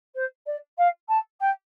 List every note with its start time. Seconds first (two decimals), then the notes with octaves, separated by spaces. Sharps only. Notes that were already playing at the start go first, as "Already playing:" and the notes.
0.15 C5
0.46 D5
0.78 F5
1.08 A5
1.40 G5